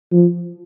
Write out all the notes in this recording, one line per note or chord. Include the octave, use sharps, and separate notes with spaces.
F3